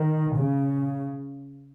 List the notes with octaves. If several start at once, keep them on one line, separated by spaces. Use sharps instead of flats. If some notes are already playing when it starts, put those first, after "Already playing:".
Already playing: D#3
C#3